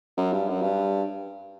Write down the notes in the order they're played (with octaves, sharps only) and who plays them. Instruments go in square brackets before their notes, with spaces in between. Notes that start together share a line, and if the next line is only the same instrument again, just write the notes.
[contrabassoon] F#2
G2
F#2
G2